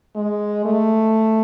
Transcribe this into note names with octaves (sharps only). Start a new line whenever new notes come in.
G#3
A3